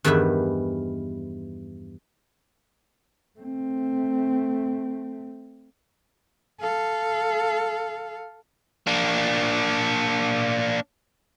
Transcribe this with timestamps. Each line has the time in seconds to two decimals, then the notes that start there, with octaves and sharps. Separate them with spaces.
0.04 E2 G2 D#3 E3 B4 E5
3.39 A3 C4
6.60 A4 F5
8.87 A#3 D4